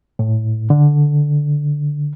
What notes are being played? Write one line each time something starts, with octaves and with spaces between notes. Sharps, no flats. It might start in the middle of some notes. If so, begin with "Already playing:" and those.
A2
D3